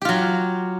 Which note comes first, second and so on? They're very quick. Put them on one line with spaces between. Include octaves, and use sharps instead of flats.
G4 F4 F#3